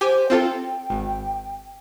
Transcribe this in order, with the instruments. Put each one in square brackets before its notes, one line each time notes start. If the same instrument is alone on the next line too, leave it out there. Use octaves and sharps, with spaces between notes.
[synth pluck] G4 G#5 D6 [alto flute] C5
[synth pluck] C4 F4 A4 [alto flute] G5
[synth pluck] G#1